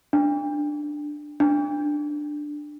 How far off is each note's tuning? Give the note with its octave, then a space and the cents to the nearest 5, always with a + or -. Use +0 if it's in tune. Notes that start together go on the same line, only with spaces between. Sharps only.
D4 +10
D4 +10